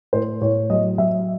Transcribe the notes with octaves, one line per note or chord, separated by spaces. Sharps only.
A2 C5
A2 C#5
F#3 D#5
F#3 E5